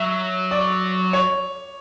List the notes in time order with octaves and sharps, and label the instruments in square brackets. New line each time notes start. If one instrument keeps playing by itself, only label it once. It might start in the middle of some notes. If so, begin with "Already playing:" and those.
Already playing: [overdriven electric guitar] F#3 [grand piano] E5
[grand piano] D5
C#5